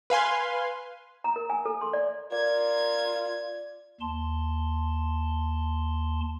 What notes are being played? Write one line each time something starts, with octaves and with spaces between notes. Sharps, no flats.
B4 F5 G#5 C6
A#5
A#4
G#5
A4
C6
D5
F4 A#4 D5 G#6
D#2 A5 C6